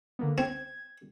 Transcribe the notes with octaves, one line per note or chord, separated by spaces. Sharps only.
D3 A#3 B3
C4 G#6